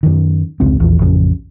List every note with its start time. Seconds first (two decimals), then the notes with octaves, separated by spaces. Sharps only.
0.03 F#2 D#3
0.60 F1 C#2 G#2 C4
0.80 A#1 E2 F3
0.99 A1 F2 C#3